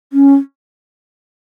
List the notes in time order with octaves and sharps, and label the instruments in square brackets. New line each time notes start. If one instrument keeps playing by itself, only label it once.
[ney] C#4